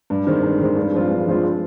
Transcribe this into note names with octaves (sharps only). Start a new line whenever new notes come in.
G2
D#3 G#3 C4
G2
D#3 G#3 C4
G2
F3 G#3 C4 F4
G2
F3 G#3 C4 F4